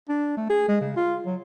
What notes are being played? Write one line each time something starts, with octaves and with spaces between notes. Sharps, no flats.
D4
A3
G#4
G#3
C#3
F4
F#3